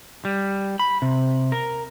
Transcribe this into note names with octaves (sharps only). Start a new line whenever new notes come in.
G3
B5
C3
A#4